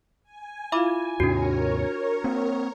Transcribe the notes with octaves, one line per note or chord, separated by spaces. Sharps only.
G#5
E4 F4 E5 F5 B5 D6
D#2 G#2 C3 D4 F#4 A#4 C#5
A#3 C4